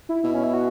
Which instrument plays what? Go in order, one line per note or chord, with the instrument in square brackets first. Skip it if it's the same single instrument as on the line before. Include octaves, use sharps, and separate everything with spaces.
[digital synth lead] E4
[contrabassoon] B2 [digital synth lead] E4
[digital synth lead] C#4
E4
F#4